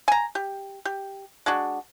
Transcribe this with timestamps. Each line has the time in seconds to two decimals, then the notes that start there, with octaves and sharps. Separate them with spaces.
0.08 G#5 A#5
0.35 G4
0.85 G4
1.46 G#3 D4 F#4